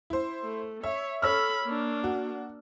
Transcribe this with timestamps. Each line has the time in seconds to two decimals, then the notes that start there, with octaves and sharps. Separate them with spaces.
0.10 E4 C5
0.43 A3
0.83 C#5 E5
1.22 A4 C#5 B5 E6 F6
1.64 A#3 D4
2.04 F#4